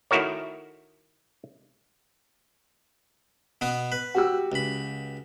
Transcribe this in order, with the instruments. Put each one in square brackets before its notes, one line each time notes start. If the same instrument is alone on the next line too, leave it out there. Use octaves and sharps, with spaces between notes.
[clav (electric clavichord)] D#3 A3 E4 F#4 A#4 C#5
[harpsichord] B2 B3 D#6
B4
[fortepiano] F#4 G4 E6
[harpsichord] C#2 B5